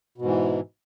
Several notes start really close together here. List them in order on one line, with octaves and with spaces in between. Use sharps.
B2 G#2 E3